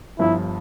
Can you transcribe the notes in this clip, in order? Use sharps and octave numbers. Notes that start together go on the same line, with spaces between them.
G1 G2 F3 E4